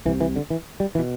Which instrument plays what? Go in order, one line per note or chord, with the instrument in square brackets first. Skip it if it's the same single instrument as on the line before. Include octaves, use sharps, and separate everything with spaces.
[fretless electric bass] C2 E3
C3
E3
D3
E3
G3
E3
B2